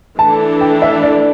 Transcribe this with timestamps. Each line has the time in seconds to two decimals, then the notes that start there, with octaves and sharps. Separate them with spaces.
0.19 E3 A3 D4 A4 A5
0.61 G5
0.82 E5
1.03 D5